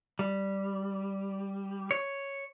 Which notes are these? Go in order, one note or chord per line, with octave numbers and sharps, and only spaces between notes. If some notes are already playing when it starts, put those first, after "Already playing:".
G3
C#5